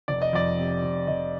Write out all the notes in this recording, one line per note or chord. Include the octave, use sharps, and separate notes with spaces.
F1 D5
D#5
F2 D5
C3
F1
F1 D#5